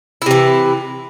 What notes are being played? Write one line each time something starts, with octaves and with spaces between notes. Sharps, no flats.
C3 E3 E4